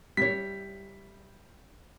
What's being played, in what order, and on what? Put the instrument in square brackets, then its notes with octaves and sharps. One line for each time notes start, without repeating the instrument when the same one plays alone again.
[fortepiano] G3 [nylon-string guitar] C#5 E5 [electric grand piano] B6